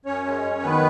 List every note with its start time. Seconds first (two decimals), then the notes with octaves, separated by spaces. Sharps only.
0.05 F#2 C#4 C#5
0.25 G#3
0.44 F#2
0.63 D#3 B3 B4